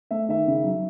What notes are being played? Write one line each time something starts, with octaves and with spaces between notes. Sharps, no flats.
A3 E5
D#3 E5
C#3
F#3